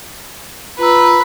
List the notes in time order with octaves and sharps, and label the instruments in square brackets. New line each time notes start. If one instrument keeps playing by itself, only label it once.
[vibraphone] F4 A#5 E6 [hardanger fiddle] B4